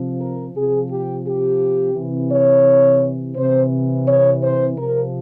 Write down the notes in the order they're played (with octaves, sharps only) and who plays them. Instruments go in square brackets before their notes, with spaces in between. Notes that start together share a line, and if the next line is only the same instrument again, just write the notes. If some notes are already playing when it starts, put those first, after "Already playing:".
Already playing: [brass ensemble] C3 F3
A#4
C3 F3 G#4
G4
G4
C3 E3
C#5
C3 E3 C5
C#5
C5
C3 F3 A#4